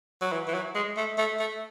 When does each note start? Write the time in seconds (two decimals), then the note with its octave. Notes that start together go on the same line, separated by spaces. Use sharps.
0.22 F#3
0.32 E3
0.48 E3
0.54 F#3
0.75 G#3
0.97 A3
1.18 A3
1.39 A3